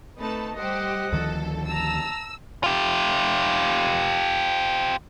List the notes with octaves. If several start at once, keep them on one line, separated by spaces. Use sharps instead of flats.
A3 C4 D#4 B4 A5
G3 G4 C5 D#5 F#5
D2 D#3 F3 A4
A5 A#5 E6
F4 G4